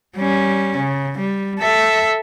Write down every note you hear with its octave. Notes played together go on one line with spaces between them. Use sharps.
G3 C#4
C#3
G3
A4 E5